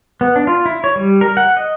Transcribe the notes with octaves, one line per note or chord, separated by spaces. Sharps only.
B3
D4
F4
E4
C#5
G3
A#4
F#5
D#5